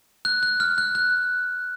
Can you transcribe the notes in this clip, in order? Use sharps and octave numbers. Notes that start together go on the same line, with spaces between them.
F#6
F#6
F6
F#6
F#6